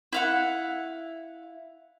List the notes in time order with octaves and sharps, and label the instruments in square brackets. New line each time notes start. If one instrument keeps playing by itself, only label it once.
[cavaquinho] E4 F5 F#5